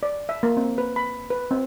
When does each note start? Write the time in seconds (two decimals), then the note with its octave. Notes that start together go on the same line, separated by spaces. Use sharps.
0.03 D5
0.29 E5
0.43 A#3
0.57 C4
0.78 B4
0.96 B5
1.30 B4
1.51 C4